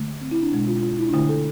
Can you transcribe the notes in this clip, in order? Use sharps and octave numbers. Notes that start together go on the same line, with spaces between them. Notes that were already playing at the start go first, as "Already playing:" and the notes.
Already playing: D3 A3
C4
E4
D4
B2 G#3
F4
F4
E4
D4
D3 A3 E4
A4